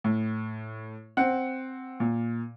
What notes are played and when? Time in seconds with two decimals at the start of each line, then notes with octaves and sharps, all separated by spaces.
0.04 A2
1.17 C4 F#5
2.00 A#2